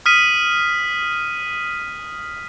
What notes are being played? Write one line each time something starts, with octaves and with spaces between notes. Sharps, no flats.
D#6 F6 B6 D#7